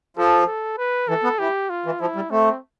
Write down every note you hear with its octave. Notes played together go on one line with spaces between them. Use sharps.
F3 A4
A4
B4
E3 A4
B3
E3 G4
F4
E3
F3 E4
G3
A3 C4